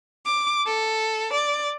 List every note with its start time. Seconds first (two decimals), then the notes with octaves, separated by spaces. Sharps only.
0.25 D6
0.66 A4
1.32 D5